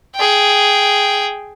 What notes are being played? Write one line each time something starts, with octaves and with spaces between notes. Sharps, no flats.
G#4 G5